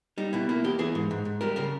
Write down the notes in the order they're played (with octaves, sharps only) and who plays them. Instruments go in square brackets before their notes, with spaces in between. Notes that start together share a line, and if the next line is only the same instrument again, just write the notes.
[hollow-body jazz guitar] G3 D#4
B2 E4
A#3 E4
E2 G4
E3 G#4
G#2
G#2
G#2
G3 A#4
C#3 A#4